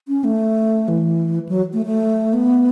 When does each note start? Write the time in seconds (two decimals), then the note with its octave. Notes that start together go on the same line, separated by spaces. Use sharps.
0.08 C#4
0.24 A3
0.88 E3
1.49 F#3
1.73 A3
1.86 A3
2.33 B3